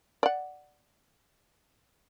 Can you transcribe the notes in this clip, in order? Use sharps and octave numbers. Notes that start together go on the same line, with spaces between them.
D5 F#5